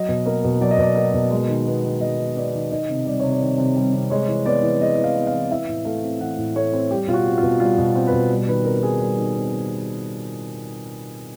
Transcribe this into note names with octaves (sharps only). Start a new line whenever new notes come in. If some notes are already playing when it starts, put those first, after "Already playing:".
Already playing: F#3 D#5
B2
A#3
B2
F#3 D5
D#5
B2 D5
A#3
B2
G#3
D#3
B3
D#3
G#3 D#5
D#3
B3 D5
D#3
D#3 D#5
C3
G3 D5
C3 C#5
D5
D#3
C3
G3
C3
G#3 C#5
E3
B3 D5
E3
G#3 D#5
E3
F5
B3
F5
E3
E3 E5
A2
A3 F5
C4
E3 F#5
A2
A3 C#5
C4
G3 G4
B2 F4
F#4
C4
F4
B2
G3 F4
B2
C4
B4
B2
G3
D#3 B4
C4 A#4
D#3 G#4
G3
D#3
C4
D#3